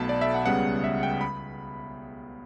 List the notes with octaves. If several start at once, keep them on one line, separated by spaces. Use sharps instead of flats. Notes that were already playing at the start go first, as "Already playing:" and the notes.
Already playing: B1 B2 A3 A5 B5
D5
E5
F#5
C#2 C#3 G3 B3 F#5
E5
G5
B5